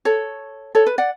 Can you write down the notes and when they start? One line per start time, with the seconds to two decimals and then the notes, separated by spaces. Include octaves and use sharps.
0.05 A4 C#5
0.75 A4 C#5
0.87 B4
0.98 D5 F#5